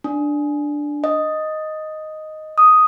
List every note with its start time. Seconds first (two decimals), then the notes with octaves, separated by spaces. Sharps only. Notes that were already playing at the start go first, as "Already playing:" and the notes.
0.04 D4
1.04 D#5
2.58 D#6